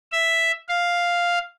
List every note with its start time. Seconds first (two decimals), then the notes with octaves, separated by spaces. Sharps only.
0.12 E5
0.69 F5